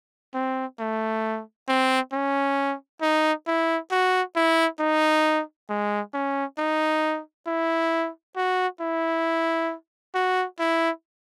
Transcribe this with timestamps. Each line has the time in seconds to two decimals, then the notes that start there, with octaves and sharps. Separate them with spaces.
0.34 C4
0.79 A3
1.68 C4
2.12 C#4
3.01 D#4
3.47 E4
3.91 F#4
4.36 E4
4.79 D#4
5.69 G#3
6.14 C#4
6.58 D#4
7.47 E4
8.36 F#4
8.81 E4
10.15 F#4
10.59 E4